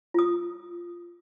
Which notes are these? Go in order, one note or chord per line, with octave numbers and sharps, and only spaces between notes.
F4 D#6